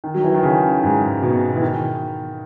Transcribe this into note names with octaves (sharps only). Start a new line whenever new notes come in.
D#3
F#3
E3
D#3
C#3
G#2
B2
E3
D#3